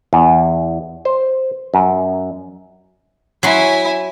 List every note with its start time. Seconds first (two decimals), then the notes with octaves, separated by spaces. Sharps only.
0.13 E2
1.05 C5
1.74 F#2
3.43 F#3 E4 G#5 C6